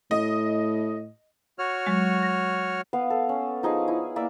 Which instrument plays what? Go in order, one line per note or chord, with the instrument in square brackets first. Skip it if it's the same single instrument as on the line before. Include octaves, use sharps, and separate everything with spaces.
[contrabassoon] A2 [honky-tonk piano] D#5
[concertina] F#4 C#5 F6
[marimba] F#3 G#3
A#6
[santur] B3 B4 F5
A4
C#4
F3 D#4 G#4 G#5
E4 G#5
A#3 D5 E5 D6